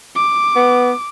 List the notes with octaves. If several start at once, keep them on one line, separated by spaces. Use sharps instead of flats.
D6
B3